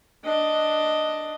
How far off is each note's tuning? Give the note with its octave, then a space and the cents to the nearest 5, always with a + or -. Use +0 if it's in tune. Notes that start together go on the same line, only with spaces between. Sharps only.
D4 +10 D#5 +0